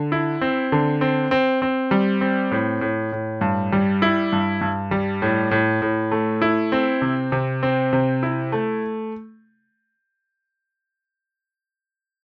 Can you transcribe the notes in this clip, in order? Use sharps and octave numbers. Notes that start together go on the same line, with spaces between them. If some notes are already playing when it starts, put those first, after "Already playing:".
Already playing: D3
E4
C4
D3
C4
C4
C4
G3
C4
A2
A2
A2
G2
G3
E4
G2
G2
G3
A2
A2
A2
A3
E4
C4
C3
C3
C4
C3
E4
A3